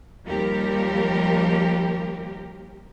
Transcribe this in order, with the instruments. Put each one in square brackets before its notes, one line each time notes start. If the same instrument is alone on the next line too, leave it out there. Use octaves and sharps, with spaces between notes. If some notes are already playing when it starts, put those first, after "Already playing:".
[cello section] D#2 F3 G3 G4 A#4